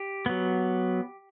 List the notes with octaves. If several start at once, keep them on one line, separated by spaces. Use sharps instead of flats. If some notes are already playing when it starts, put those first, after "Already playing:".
Already playing: G4
F#3 B3